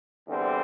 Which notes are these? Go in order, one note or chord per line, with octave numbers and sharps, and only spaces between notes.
E2 D3 G3 C4